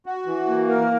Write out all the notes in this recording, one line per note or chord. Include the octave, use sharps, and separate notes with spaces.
F#4
E3
A#3
A#4